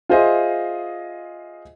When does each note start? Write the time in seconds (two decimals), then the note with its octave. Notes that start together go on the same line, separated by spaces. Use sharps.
0.09 F4 G#4 C5 D#5 E5